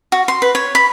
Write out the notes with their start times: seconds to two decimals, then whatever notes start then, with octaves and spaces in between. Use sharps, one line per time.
0.12 F#4
0.28 C6
0.42 B4
0.55 C#5
0.75 B5